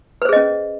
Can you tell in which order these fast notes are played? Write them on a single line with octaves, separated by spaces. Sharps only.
B4 C5 G#4 D#5 C#4